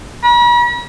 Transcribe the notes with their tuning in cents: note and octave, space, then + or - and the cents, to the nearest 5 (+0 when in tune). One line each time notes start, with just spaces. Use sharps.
B5 -45